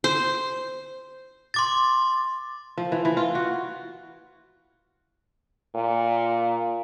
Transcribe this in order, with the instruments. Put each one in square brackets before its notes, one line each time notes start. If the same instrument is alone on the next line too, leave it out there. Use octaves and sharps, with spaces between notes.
[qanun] C5
[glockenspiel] C6 D6 A6
[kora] F3
E3
E3
F4
F#4
[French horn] A#2